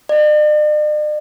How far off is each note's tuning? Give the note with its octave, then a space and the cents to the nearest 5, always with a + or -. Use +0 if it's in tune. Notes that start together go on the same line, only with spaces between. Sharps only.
D5 +45